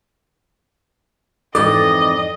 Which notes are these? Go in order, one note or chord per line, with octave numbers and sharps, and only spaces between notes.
F2 G#2 E3 A4 D5 D#5